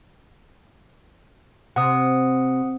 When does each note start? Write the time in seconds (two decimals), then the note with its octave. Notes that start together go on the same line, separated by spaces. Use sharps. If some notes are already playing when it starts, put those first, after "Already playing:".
1.76 C3 F#5 D#6